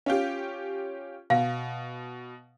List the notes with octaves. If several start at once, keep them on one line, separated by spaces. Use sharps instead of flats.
C#4 F4 G4
B2 F5